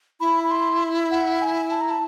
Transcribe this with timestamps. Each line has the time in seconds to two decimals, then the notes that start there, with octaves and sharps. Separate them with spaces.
0.20 E4 B5
0.44 B5
0.51 C6
1.11 F#5
1.42 G#5
1.71 A5
1.81 A#5
1.91 A5